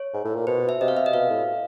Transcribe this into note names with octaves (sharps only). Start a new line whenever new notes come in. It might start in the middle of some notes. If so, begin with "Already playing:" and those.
Already playing: C#5
G#2
A2
A#2
B2 C5
E5
C3 D#5
F5
E5
D#5
B2 F5
A2